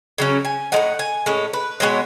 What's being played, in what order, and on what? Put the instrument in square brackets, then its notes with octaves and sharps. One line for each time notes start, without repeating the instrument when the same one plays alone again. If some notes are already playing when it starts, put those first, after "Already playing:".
[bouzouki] C#3 F#3 C#4
G#5
G#3 D#4 F#5
A2
G#5
A2 G#3 C#4
B4
B2 G#3 B3 C#5